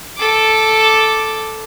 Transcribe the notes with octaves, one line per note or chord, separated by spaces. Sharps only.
A4 D6